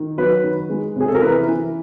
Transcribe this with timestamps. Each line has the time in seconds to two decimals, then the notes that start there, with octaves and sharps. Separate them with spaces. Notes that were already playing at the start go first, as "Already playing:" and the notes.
Already playing: D#3
0.18 F#3 B4
0.44 D#3
0.70 G#3
0.96 C3 G#4
1.08 A4
1.15 A#4
1.22 E3 B4
1.48 E3